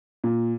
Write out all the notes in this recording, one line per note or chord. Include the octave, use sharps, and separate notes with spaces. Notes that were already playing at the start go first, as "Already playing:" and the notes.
A#2